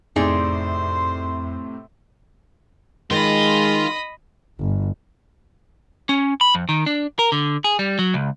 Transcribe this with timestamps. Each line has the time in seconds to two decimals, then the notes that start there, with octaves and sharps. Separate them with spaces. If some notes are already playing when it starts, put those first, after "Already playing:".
0.16 F2 A2 C3 D#4 G#4 C5 D5 C6
3.11 D#3 G#3 F4 D#5 B5
4.60 G1
6.09 C#4
6.41 B5
6.55 F2
6.69 D#3
6.86 D4
7.19 A#4
7.32 D3
7.64 G#4
7.79 G3
7.99 F#3
8.14 C#2